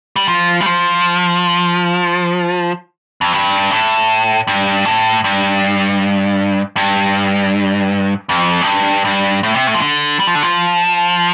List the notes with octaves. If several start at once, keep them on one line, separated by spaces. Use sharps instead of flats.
G3
F3
G3
F3
F2
G2
A2
G2
A2
G2
G2
F2
A2
G2
G2
A2
C3
A2
F3
D3
G3
F3
D3
F3